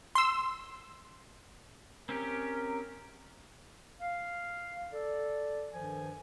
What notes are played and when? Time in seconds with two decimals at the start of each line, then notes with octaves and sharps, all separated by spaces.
0.15 C6 E6
2.09 C4 C#4 G4 A#4
4.00 F5
4.92 A4 D5
5.72 G2 D#3 F3 A4 G#5